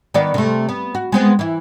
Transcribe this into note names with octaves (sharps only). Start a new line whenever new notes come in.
D#3 B3 D5
C3 A3
B3
F#4
G#3 B3 C4
E3 E4